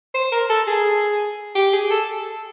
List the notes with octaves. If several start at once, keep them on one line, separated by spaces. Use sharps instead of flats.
C5
A#4
A4
G#4
G4
G#4
A4